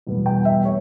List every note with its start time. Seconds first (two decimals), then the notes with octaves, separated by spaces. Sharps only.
0.07 E2 B2 G3 B3
0.26 G5
0.45 E5
0.65 C#5